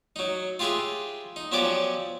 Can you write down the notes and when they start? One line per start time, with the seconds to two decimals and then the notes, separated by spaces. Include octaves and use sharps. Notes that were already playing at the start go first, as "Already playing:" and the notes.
0.16 F#3 D#4
0.59 F4 G4 G#4 B4 E5
1.36 D#4
1.52 F3 F#3 B3 C#4 G4 D5